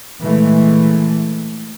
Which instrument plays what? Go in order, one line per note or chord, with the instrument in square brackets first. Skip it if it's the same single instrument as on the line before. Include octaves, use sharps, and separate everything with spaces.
[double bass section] A#2 E3 G#3 A3